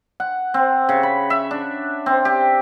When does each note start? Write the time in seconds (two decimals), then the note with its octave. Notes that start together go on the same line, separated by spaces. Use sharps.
0.20 F#5
0.54 C4
0.89 C#3
1.03 B5
1.30 E5
1.51 D4
2.06 C4
2.25 G4